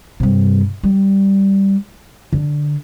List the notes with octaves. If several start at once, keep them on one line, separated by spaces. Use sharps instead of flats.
G2 C3
G3
D3